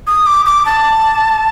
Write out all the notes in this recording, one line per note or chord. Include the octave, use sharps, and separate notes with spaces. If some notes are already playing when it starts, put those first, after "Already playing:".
D#6
D6
D6
A5